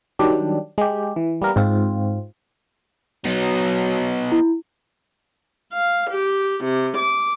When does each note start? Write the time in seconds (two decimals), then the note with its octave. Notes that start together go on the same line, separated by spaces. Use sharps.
0.19 D#3 F#3 G3 D4 G4
0.78 G#3 G4
1.16 E3
1.42 G3 A#3 B3 A#4
1.56 G#2 C4 F4
3.25 F#3 B3 D#4
4.32 E4
5.74 F5
6.12 G4
6.65 C3
6.99 D6